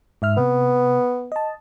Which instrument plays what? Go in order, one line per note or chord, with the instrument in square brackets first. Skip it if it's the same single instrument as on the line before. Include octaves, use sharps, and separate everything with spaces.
[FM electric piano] G#2 E5 F6
[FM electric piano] C3 [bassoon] B3
[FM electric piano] D#5 A5